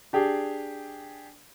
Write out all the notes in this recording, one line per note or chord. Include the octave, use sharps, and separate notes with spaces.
D4 G4 G#4